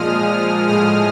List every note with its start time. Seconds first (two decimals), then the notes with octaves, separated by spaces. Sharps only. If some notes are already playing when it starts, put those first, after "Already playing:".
Already playing: A#2 F3 G#3 D#6 F6
0.68 A2 F3 G#3 D#6 F6